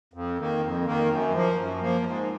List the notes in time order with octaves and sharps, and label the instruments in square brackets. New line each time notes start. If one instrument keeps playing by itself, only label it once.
[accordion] F2
D#3 A#3
F2
D#3 A#3
F#2
F3 A#3
F#2
F3 A#3
G#2